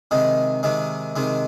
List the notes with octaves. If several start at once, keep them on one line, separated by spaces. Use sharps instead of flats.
C3 D#3 G#3
C3 D#3 G#3
C3 D#3 G#3